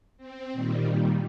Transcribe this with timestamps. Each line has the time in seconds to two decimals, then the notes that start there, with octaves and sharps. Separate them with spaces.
0.18 C4
0.53 A#2 D#3 G3